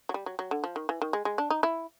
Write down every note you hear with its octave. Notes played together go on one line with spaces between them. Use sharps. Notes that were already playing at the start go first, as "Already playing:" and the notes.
F#3
G3
F#3
F#3
D3
F3
D#3
E3
D#3
G#3
G#3
D4
D#4
E4